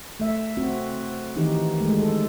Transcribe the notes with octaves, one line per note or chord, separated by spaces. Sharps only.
A3 E5
C4 F#4
D#3 E3 D#4 G4
G#3 A3
A4